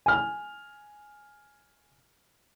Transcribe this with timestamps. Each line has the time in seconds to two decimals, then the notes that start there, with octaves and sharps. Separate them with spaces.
0.06 G#5 F6